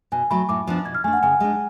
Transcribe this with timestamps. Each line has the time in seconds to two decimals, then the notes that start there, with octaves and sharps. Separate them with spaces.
0.12 B2 G#5
0.30 F#3 A3 B5
0.49 A2 D6
0.67 F3 B3 D4
0.85 B2 G#6
0.95 F6
1.04 A3 D4 G#5
1.13 F#5
1.23 C#3 G#5
1.40 G#3 D4